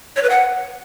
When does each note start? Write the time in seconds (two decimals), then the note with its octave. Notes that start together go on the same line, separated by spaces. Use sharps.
0.16 C#5
0.23 B4
0.30 F#5